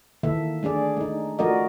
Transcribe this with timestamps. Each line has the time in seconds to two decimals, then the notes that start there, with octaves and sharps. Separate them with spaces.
0.23 D#3 E3 A#3 A4 E5
0.63 A3 D4 G#4 D5
0.97 A3 D#4
1.39 F3 A3 F#4 A#4 D5 D#5